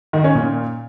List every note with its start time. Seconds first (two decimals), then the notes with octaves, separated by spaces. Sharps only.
0.13 D#3
0.24 C#4
0.35 A#2